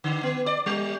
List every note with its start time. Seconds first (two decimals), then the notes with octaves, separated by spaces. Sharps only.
0.04 D3
0.23 B3
0.46 D5
0.66 G3